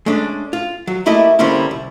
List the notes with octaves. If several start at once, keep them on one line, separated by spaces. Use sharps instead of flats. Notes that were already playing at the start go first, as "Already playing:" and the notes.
G#3 A3 C#4 D4
F4
F#3
A3 A#3 E4 G4 D#5 E5
D3 G3 A#3 C4 C#4 E4
C2